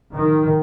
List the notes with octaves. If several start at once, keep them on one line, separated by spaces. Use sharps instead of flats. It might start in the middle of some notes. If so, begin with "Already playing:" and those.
D#3